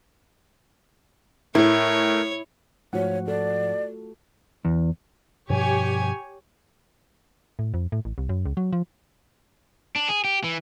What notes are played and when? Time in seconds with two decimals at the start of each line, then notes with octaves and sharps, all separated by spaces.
1.55 A2 A3 E4 A#4 C#5
2.93 G#2 F3 A3 F4 F#4 C#5 F#5
3.28 A4 D5
4.65 E2
5.50 G2 B2 F3 G4 C#5 G#5
7.59 A2
7.74 F2
7.92 A2
8.05 A1
8.18 C2
8.29 F#2
8.46 C#2
8.57 F#3
8.73 F3
9.96 D4
10.09 G#4
10.24 G4
10.44 E3